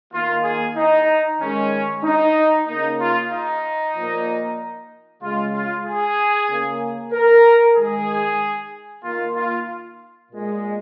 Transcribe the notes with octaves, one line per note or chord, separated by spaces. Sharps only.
D#3 A#3 F4
G#4
D#4
D#3 G#3 C#4
D#4
C#3 A#3 D#4
F4
D#4
A#2 F3 A#3
C#3 G#3 F4
F4
G#4
C#3 A#3
A#4
D#3 G#3 G#4
D#3 A#3 F4
F4
A#2 G#3